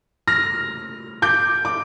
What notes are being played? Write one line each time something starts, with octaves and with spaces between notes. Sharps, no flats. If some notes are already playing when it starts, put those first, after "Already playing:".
F6 A#6
D6 G6
D6